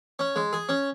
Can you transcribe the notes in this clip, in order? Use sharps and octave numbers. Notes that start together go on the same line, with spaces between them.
C#4
G#3
G#4
C#4